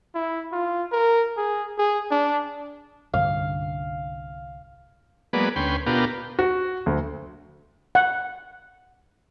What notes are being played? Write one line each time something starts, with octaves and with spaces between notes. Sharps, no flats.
E4
F4
A#4
G#4
G#4
D4
C2 G2 D3 F5
F#3 G#3 A#3 B3 B4 D5
D2 C#4 B4 G5 C6
B2 B3 D4 F4 G4 A#4
F#4
D2
F#5